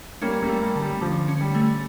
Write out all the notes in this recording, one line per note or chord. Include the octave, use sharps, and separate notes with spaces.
G3 A#3 C#4
G3 A#3
A3
G3 A#3
D3
G3
D3 F3
C#4
G3
A3